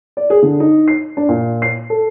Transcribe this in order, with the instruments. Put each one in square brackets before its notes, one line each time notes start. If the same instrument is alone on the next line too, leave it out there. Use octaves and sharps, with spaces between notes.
[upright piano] D5
G#4
D3
D#4
C7
D4
A#2
C7
A4